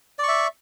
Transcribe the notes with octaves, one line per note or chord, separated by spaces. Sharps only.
D5 E5 C#6